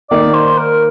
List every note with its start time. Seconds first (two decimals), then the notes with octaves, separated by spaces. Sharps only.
0.10 D#3 A#3 D#4 D5
0.34 C5
0.58 A#4